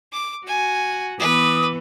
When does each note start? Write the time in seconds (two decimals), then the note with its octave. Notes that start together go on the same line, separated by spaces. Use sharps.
0.12 D6
0.47 F#4 G#5
1.19 E3 B3 B4 D6 D#6